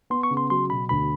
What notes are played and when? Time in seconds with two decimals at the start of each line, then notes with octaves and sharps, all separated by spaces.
0.10 B3 C6
0.23 C#6
0.31 C#3
0.37 C6
0.50 F#3 C6
0.70 B2 B5
0.89 D2 B5